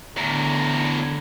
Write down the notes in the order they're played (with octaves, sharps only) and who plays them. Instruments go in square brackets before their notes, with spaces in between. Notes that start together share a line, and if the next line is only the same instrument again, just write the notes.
[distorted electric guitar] E2 A2 [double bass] D3 [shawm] A#5